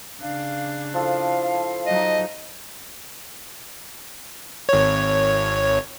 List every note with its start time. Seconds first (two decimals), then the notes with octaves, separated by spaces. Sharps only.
0.21 C#3 D4 F5
0.94 F3 E4 A4 F5
1.86 F#3 D#4 D#5
4.69 G#1 C#5